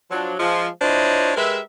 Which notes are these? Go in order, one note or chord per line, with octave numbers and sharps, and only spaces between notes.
F3 F#3 D4
F3 G#3
D4 E4 F4 C5 C#5 D#5
G#3 G4 A#4 B4 E5